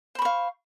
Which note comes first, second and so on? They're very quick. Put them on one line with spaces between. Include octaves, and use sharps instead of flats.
C5 B5 C#6 F5